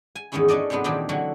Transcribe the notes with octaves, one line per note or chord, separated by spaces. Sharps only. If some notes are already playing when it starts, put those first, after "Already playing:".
G#5
E2 G#2 D#3 G#3 C#4 E4
A3 C#4 D4 D5 D#5
G#2 C3 F#3 B3 D4
A#2 D#3 E3 C4 D4 G4
D3 E3 F#3 F#4 A4